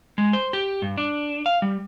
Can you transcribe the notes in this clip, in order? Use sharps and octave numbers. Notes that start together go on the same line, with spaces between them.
G#3
C5
G4
G2
D4
F5
G3